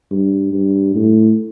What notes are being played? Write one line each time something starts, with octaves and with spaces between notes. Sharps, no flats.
G2
G2
A2